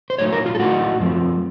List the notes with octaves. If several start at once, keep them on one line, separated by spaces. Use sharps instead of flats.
C5
A2 F#3 A3 D#4 C#5
A#4
F4
A4
A2 A3 C4 D#4 F#4
F#2 F3 A3 C4